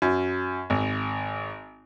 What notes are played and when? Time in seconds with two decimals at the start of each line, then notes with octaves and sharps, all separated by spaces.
0.02 F#2
0.70 G#1